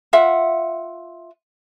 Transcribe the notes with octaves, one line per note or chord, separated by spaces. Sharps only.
F4 E5 F#5